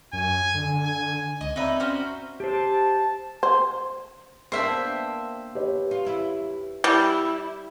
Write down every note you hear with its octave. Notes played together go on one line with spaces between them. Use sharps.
F#2 G#5
D3
G#5
C#2 D#5
C4 D#4 B4 D5 E5 A#5
C#4 F#4 C5
G4 C5 A5
C5
A#3 B3 D4 C5 E5 G5
G4 B4 C#5
F4
E2 E4
G3 E4